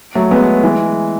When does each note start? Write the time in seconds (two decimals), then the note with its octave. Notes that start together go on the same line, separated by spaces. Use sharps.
0.15 F#3 A3
0.31 G#3 B3
0.63 E3 G#3